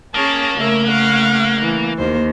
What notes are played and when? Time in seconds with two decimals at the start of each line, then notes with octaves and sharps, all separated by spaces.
0.15 A#3 C#4 G#4 C#5 A5
0.59 C#3 A3 A#4 E5
0.88 F5 F#5
1.61 E3
1.98 D#2 A#3 C5